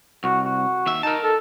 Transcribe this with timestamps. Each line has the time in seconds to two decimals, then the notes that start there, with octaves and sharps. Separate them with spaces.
0.24 C2 F#4
0.44 F#4
0.87 D#2 E5
1.03 D#4 A#4 A5
1.23 A4